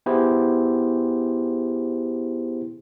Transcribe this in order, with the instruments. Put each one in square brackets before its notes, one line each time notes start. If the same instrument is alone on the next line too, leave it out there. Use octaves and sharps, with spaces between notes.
[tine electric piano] B3 E4 G4 G#4 C5